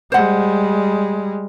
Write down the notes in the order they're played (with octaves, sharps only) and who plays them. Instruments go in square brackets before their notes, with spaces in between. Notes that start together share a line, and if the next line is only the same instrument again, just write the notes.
[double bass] G3 G#3 [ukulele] C5 F#5